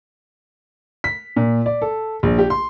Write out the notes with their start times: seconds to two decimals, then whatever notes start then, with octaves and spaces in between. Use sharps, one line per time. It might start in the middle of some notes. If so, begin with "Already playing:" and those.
1.04 B6
1.37 A#2
1.66 D5
1.82 A4
2.23 A#1
2.38 G4
2.50 C6